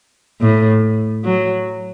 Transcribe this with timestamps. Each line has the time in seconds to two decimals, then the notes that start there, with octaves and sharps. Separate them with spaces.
0.41 A2
1.24 F#3